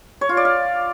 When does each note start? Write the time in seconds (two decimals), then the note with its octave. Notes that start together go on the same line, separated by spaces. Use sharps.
0.21 C#5
0.29 F4
0.37 D5
0.45 F5